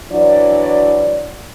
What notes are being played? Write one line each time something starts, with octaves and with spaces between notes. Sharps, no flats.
E3 F#3 D4 D5